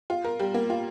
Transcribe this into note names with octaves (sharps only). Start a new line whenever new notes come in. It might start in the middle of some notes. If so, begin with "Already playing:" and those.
F4
A#4
G3
A#3
F4